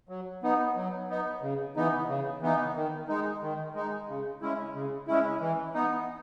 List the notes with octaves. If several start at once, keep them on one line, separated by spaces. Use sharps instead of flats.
F#3
B3 D#4
F#3
B3 D#4
C#3
E3 B3 D#4
C#3
E3 B3 D#4
D#3
G#3 D#4
D#3
G#3 D#4
C#3
G#3 C#4 E4
C#3
G#3 C#4 E4
E3
B3 D#4